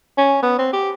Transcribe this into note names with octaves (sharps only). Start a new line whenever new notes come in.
C#4
B3
C4
G4